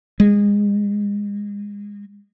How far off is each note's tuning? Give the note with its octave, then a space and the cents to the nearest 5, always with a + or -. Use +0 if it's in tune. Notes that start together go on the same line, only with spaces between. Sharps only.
G#3 -25